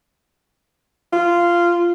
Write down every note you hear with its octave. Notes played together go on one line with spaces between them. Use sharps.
F4